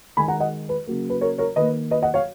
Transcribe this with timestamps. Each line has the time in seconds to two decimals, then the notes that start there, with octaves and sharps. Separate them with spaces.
0.17 D#3 G#3 G#5 B5
0.28 F#5 A#5
0.40 D#5 F#5
0.69 B4
0.87 C#3 F#3 A#3
1.10 B4
1.21 A#4 C#5
1.38 A#4 C#5
1.56 D#3 A#3 B4 D#5
1.91 B4 D#5
2.02 D#5 F#5
2.14 C#5 F5